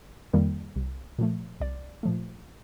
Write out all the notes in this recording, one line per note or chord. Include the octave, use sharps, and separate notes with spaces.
F2 D#3 G3 A#3
C2
A#2 F3 A3
C2 D5
A#2 F3 A3